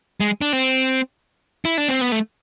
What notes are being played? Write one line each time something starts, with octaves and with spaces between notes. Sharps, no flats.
G#3
D4
C4
E4
D4
C4
B3
A3